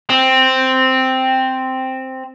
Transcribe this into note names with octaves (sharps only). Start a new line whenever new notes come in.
C4